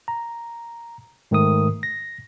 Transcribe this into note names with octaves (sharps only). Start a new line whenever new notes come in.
A#5
G#2 D#3 A3 D#6
A#6